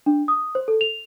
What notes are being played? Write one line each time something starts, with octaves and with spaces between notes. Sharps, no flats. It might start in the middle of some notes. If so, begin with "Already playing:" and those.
D4
D#6
C5
A4
F7